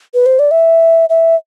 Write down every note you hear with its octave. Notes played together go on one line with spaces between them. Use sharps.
B4
C5
D5
E5
E5